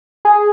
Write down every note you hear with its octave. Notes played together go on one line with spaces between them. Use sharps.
G#4